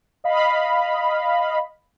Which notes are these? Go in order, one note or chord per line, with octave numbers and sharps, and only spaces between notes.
D#5 F5 B5